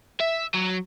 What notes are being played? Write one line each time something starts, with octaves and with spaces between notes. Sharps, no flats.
E5
F#3